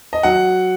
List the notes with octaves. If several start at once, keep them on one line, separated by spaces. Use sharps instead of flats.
D#5
F#3 F#5